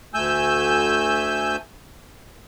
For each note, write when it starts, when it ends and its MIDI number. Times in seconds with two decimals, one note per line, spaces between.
0.14 1.56 38
0.14 1.56 57
0.14 1.56 80
0.14 1.56 88
0.14 1.56 91